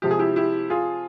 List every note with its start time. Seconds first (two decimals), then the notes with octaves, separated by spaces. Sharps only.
0.02 C3 F3 G#3 G4
0.11 G#4
0.19 E4 G4
0.36 E4 G4
0.70 F4 G#4